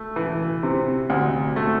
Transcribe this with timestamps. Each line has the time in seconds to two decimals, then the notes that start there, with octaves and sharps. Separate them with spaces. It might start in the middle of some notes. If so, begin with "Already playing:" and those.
Already playing: A3
0.16 E3
0.63 C3
1.10 D2
1.56 A3